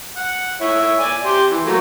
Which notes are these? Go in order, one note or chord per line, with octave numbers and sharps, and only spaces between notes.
F#5
E4 C#5 E5
D5 G#5
G4 C6
E3
F#3 A3 A#3